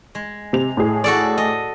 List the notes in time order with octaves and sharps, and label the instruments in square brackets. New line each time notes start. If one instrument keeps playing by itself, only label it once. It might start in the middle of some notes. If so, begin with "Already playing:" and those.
[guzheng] G#3
[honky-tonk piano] C3 F7
A2 G#4
[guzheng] F#4 A4 D5
D#5